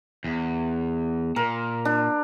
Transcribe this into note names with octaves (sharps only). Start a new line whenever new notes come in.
E2
A#2 A#4
D4